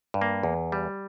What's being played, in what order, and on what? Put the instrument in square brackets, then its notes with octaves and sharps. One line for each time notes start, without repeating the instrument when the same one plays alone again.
[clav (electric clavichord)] G2
A#3
E2
G3